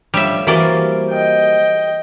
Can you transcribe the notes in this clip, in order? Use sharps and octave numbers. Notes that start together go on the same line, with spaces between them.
D2 F3 G3 C#5 E5
E3 G3 A#3 C4 F#4 A#4 D5
D#5 G5